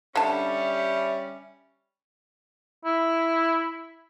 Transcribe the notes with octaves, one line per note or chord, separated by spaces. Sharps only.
D3 G3 C#4 E5 A5
E4